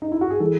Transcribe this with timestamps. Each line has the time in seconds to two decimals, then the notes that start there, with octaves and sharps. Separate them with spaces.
0.02 D#4
0.12 E4
0.21 F#4
0.31 G#4
0.40 E3 G#3 A4